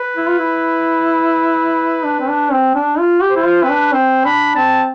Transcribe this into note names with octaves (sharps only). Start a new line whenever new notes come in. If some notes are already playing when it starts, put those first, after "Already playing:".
Already playing: B4
E4
F4
E4
D4
C4
D4
C4
D4
F4
G4
C5
E4
F4
C4 B4
D4
C4 C5
D4 B5
C4 A5